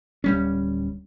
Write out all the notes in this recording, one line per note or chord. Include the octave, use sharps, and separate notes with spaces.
D1 G3 C#4